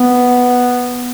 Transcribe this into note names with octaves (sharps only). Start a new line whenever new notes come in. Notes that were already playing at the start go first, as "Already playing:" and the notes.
Already playing: B3